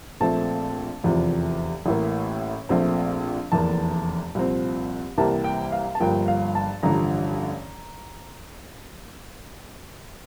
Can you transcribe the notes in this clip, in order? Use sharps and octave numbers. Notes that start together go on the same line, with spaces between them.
A#1 A#2 A3 C4 A5
F1 E2 C3 F3
A1 A2 E3 A#3
A#1 A#2 A3 C4
F1 E2 E3 A#3 A5
C2 A#2 F3 C4
C2 C3 E3 G3 A#3 A5
G5
F5
A5
G1 G2 F3 A#3 G5
F5
A5
A1 G2 D3 F3 A#5